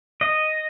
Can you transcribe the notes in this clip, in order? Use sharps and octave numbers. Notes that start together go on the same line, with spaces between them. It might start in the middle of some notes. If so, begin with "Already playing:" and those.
D#5